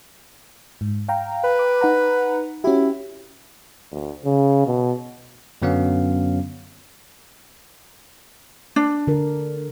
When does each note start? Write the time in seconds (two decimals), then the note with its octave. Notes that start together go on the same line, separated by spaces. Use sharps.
0.81 G#2
1.08 F5 G5 A#5
1.44 B4
1.59 D6
1.81 D#4 F#5 A#5
2.64 C#4 E4 F#4 G4
3.92 D2
4.25 C#3
4.67 B2
5.62 F#2 D3 F#3 B3 C#4 F5
8.76 D4
9.07 D3 A#4